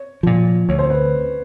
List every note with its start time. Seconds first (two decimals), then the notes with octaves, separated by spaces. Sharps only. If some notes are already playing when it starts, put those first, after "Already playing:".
Already playing: C#5
0.23 A#2 F3
0.69 D2 C#5
0.79 C5
0.90 B4